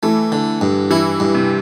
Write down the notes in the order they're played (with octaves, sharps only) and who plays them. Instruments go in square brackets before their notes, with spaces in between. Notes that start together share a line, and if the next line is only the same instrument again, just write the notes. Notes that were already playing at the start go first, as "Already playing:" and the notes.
[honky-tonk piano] E3 [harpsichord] A3
[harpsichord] D3
G2
[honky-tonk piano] E3 [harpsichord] E4
[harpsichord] G2
[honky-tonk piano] C3